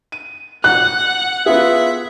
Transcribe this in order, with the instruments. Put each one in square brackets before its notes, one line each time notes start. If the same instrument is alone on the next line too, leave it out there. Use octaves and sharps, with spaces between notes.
[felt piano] D#7
[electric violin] F#5 [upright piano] F#6
[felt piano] B3 F4 G#4 [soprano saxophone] E5